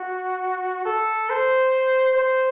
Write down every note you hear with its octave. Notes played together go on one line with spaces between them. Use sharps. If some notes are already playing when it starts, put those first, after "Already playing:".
Already playing: F#4
A4
C5
C5